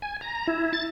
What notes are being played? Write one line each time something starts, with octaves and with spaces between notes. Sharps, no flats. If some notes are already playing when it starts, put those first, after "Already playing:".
G#5
A#5
E4
A6